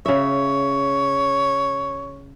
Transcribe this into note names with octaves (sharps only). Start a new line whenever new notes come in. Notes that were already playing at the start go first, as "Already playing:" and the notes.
C#3 C#5 E5